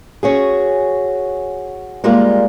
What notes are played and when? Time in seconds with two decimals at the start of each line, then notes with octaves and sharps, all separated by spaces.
0.23 C#4 F#4 G#4
2.04 G3 G#3 A#3 F4 A#4 D5